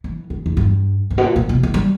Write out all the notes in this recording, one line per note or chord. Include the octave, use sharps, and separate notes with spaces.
E3
C#3
E2
G2
G#2
B2
A#2
A#2
B2
E3
G3